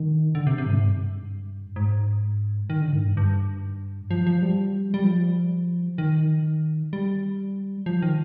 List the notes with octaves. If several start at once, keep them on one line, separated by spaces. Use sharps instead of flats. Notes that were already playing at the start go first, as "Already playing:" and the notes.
Already playing: D#3
D3
C3
C3
G2
G#2
G2
G#2
D#3
D3
G#2
G2
G2
F3
F3
G3
G3
F3
D#3
G3
F3
D#3